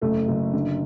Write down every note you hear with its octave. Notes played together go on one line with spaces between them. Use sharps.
F#1 A3
F#1
D3